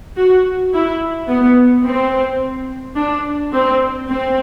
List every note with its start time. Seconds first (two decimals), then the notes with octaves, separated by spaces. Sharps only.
0.17 F#4
0.73 E4
1.29 B3
1.85 C4
2.96 D4
3.52 C4
4.08 C4